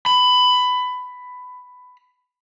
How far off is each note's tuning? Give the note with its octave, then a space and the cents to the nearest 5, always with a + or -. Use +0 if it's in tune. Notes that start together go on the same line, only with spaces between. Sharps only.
B5 +15